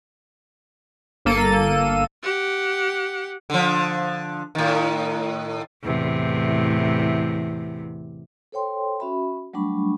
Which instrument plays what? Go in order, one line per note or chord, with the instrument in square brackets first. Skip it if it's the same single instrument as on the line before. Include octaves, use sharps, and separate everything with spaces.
[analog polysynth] G1 A#3 A4 D#7
[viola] G4 F#5
[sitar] D3 F3
A2 D#3
[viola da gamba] E2 A2 C3
[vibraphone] A4 C5 C#5 G5 C6
C#4 F#4 E5 B5
F#3 G3 A3 D4 B5 C#6